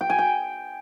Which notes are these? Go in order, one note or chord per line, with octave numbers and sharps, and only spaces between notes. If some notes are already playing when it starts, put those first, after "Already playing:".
G5
G#5
G5